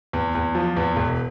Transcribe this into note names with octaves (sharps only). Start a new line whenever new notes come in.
E2
E2
F3
E2
E1